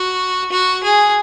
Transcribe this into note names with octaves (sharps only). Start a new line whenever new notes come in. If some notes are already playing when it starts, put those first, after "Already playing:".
Already playing: F#4
F#4
G#4